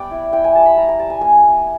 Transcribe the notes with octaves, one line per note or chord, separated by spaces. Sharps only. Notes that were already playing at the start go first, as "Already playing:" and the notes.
Already playing: G3 B3 D5 G5
E4
E4 G5
G#5
G3 A5
B5
G3 A#5
A#5
G3 A5
G#5
A#3 G#5
A#3